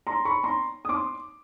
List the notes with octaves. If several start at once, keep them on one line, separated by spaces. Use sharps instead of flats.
A#5 C6
B5 C#6
A#5 C6
D#6
C6 D6